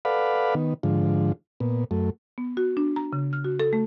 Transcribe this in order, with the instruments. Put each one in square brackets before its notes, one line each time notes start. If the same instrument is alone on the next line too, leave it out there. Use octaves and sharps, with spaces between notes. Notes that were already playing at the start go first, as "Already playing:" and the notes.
[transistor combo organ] A4 B4 D5 F5 F#5 B5
D#3 B3
G#2 D3 F3
A#2 B3
F#2 A3
[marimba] B3
F#4
D4
A#5
C#3
F6
F#4
A4
A3